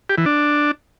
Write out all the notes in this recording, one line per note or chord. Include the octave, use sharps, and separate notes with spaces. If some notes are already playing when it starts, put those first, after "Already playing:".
G4
E3
D4